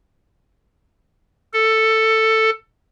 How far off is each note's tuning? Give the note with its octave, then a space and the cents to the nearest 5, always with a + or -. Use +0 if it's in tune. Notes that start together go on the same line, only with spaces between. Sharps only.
A4 +10